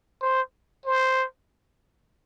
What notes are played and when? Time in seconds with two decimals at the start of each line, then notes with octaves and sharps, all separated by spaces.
0.22 C5
0.86 C5